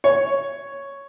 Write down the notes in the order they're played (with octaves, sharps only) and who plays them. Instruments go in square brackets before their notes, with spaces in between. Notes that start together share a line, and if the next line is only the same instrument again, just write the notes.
[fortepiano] C#5